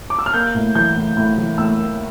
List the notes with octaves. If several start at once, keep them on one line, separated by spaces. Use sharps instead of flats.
D6
E6
F6
A#3 G6
A2
E3 G6
A2
A2
E3
A2 E6
A#3